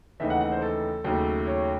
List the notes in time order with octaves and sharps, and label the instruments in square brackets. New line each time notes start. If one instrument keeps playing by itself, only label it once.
[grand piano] D#2 C#3 E3 A3 D#4 E5
F#5
F#5
C5
A4
D#2 C#3 F#3 A3
C#5